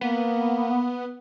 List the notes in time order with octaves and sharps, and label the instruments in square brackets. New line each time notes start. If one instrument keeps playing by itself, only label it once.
[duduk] A#3 [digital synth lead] B3